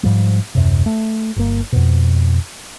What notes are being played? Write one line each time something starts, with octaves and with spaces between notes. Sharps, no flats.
G#2 F3 G3
D#1 F#2 C3
A3
G1 A#3
F2 B2